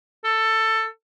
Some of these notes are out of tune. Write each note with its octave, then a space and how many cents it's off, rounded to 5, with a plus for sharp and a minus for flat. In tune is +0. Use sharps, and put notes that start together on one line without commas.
A4 +15